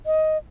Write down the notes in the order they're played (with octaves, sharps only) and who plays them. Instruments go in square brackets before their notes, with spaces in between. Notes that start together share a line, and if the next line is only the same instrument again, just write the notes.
[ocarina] D#5